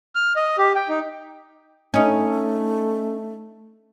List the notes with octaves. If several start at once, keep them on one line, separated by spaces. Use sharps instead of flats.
F6
D#5
G4
G5
D#4
A3 C#4 D#4